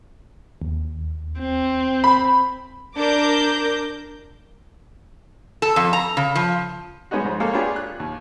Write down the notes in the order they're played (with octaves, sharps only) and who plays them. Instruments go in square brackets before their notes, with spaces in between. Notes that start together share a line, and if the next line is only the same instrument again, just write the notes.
[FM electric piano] D#2
[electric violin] C4
[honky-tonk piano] B5
[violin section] D4 A#4 D6 G6 A#6
[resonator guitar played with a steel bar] A4
F2
A#5
C#3
F3
[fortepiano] G3 G#3 B3 C#4 D#4 F#4
F2 G#2 C5
G#3 A#3 C#4 A4 C#5 F5
B3 C#4 D4 F4 G4 G#4
F#6
D#2